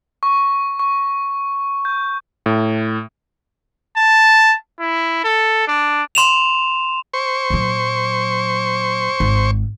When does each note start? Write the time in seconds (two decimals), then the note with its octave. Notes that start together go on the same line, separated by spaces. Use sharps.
0.23 C#6
0.79 C#6
1.85 G6
2.46 A2
3.97 A5
4.80 E4
5.24 A4
5.68 D4
6.15 C6 E7 F7
7.13 C5 C#6
7.50 A#2 F#3
9.20 G#1